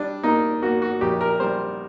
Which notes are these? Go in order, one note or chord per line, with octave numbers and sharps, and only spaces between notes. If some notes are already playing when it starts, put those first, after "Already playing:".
Already playing: G3 D4
A#3 D#4
A#3 F#4
F#4
A#1 G4
A#4
G3 C5